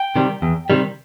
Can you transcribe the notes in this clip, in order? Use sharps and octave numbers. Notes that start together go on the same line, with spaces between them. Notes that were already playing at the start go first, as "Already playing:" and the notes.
Already playing: G5
C3 D#3 G3
E2
C3 D#3 G3